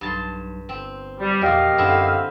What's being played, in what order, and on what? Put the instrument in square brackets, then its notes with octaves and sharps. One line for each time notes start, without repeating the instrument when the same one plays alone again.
[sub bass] B1 [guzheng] G2 A5 C6
[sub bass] G1 [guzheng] C4
[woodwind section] G3
[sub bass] E2 [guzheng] A#2 F3 [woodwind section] G4 D#5 F5
[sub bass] F#2 [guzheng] D3 C4 E4